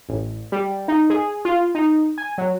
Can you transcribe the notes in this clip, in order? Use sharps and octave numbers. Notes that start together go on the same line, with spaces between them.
A1
G3
D#4
G#4
F4
D#4
G#5
F#3